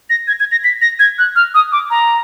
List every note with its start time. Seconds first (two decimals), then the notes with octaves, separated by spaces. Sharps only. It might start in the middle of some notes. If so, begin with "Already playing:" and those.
0.10 A#6
0.28 G#6
0.40 G#6
0.52 A#6
0.64 B6
0.82 A#6
0.99 G#6
1.19 F#6
1.36 F6
1.54 D#6
1.72 D6
1.90 A#5